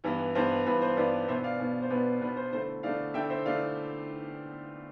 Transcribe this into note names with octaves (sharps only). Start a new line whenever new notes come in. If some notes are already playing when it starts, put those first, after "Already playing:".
G2 E3 B3 E4
G2 E3 B3 E4 C5
G2 E3 B3 E4 B4
C5
G2 E3 B3 E4 B4 D5
B2 B3 D4 C5 E5
D5 F5
B2 B3 D4
C5
B2 B3 D4 B4 D5
B2 B3 D4 B4
C5
D3 A3 E4 C5
D3 A3 E4 D5 F5
D3 A3 E4 E5 G5
C5 E5
D3 A3 E4 D5 F5